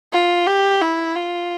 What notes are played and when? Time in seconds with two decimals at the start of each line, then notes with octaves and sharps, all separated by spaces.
0.13 F4
0.47 G4
0.81 E4
1.16 F4